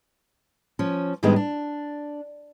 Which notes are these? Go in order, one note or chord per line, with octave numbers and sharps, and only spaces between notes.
F3 C#4
G#2 D#3 G3 G#3 B3 D4
D4